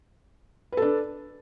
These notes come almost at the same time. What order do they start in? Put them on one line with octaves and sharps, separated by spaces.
B4 A4 D4